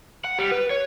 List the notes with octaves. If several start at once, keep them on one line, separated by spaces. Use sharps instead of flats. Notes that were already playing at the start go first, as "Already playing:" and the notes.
F#5
G3
B4
C#5